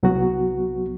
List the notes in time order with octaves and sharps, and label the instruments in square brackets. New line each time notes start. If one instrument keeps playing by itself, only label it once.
[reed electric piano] C2 F#3 B3 F#4